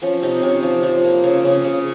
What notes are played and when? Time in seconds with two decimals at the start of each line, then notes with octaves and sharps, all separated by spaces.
0.02 F3 C#4
0.23 C3 D#4
0.43 C3 C#4
0.63 F3
0.83 F3
1.04 A#3
1.24 C#3
1.45 C#3
1.64 C#3